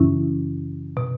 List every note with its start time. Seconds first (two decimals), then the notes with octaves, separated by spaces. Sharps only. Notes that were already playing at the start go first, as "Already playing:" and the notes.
Already playing: F#2 C#3 E3 C#4 E4
0.97 B2